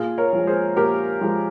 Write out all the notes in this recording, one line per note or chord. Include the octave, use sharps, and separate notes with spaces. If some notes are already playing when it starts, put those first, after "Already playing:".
Already playing: A#2 F4 G#4
A#4 C#5
F3 G#3
G#4 C5
A#2 G4 A#4
F3 G#3